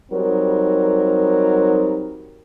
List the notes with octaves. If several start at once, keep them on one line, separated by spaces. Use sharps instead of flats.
F#3 G3 C4 D#4 A#4